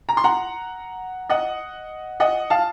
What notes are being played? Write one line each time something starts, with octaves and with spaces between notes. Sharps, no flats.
A#5
C6
F#5 A#5
D#5 F#5
D#5 F#5
F5 A5